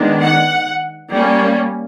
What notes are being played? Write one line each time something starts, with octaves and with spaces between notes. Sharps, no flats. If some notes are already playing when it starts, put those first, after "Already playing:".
Already playing: D#3 G#3 B3 D4
F#5
G3 A#3 C#4